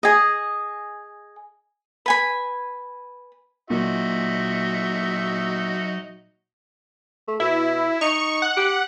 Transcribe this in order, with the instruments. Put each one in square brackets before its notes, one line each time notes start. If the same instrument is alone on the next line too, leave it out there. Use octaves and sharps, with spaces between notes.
[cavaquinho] G#4 D#5
B4 G#5 B5
[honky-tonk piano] A#2 [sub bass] F#3 [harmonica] D#4 F#4 E5
[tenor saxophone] A3
[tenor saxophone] B2 [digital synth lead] E4
[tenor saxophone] D#4 [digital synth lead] C#6
[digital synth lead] F#5
[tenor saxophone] G4